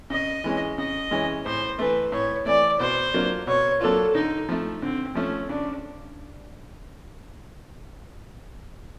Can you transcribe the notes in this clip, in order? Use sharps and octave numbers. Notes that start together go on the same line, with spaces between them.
C#3 D#5
E3 G#3 C#4
C#3 D#5
E3 G#3 C#4
A2 C5
E3 A3 B4
A2 C#5
E3 A3 D5
B2 C5
F#3 A#3 D4 F4
B2 C#5
F#3 A#3 D4 F4 A4
D3 D#4
F3 A3
D3 C4
F3 A3 C#4
C#3 D4